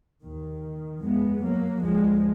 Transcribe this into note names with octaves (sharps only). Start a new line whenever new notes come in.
D#2 D#3
F2 G#3 B3
F#3 A#3
D2 F3 G#3